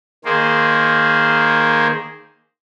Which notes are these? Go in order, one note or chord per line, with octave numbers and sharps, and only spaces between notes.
D#3 A#3 G#4 C5